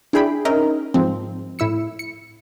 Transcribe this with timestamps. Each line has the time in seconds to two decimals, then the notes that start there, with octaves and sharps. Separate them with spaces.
0.13 D4 E4 G#4 G5 B5
0.45 C#4 D#4 A#4 D#5 E5
0.94 G#2 F3 C4
1.59 A2 E4 E6 C#7
1.99 C#7